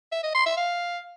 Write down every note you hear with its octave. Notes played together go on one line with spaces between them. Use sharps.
E5
D#5
C6
E5
F5